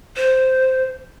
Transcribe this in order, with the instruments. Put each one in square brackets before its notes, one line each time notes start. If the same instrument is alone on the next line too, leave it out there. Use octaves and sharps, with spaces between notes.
[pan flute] C5